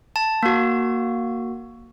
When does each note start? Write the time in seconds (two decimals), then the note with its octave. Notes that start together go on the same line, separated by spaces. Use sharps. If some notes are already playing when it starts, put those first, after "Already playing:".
0.16 A5
0.43 A#3 F#4